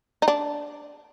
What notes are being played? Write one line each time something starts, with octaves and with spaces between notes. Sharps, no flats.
D#4
D4